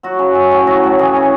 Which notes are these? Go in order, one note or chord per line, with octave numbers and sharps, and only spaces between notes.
F#3 F#4
C#3
F#3
A2
F#3 F#4
A2
E3 G#4
C#3